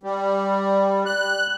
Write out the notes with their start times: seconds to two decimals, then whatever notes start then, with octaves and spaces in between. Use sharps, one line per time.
0.03 G3
1.06 F#6